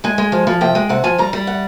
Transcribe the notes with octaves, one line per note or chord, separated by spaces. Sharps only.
G#3 G#5
G#3
F3
F3
C3 G5
G#3
C3 F#5
F3 G#5
G3 A#5
G3
F#5